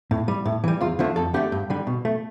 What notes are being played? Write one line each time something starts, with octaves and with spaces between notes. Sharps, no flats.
A2
G3
A2
E3 G3
E2 F4
D3 F3 A3
F2 A4
D3 A3 G4
G2
D3 G3
B2
A3